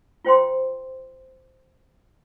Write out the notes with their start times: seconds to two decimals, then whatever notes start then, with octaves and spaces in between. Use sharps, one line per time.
0.25 F4 C5 G5 C6